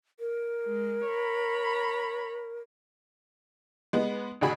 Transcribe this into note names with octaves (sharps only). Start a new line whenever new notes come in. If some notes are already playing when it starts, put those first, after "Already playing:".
A#4
G#3
C#5 A#5 B5
G#3 B3
A1 D3 F#4 G#4 B5